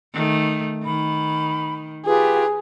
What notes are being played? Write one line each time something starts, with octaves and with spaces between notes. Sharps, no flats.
D#3 A3
D#3 B5
F4 G4 G#4 B4